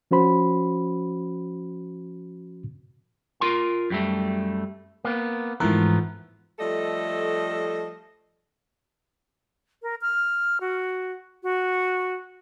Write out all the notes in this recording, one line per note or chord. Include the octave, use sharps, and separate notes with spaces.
F3 C#4 F#4 C5 B5
F4 A#4 C6
F#2 G3 A3
A#3 B3
G#2 E3 F3 A3 B3 A#4
F3 G3 A3 A4 D#5
A#4
F6
F#4
F#4